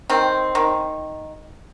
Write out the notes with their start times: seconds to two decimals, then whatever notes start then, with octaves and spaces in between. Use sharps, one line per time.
0.10 D#3 C4
0.55 D#3